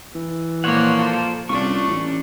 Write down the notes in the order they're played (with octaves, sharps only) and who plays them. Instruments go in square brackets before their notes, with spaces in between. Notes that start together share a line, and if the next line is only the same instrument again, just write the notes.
[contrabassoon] E3
[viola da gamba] A#2 F3 A#3 [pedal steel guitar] C5 C#5 F#5
[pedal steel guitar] F4 A4 C5
[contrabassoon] C2 [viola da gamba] A3 C#4 D4 [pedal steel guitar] F4 C#6
[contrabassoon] A1